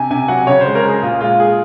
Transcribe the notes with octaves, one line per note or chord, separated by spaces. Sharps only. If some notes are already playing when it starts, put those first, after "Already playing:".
Already playing: C3 G#5
C3 G#5
F#3 F#5
C#3 C#5
G#3 C5
A#4
G#3 G#4
A#2 F4
G#3 F4
G#3 G#4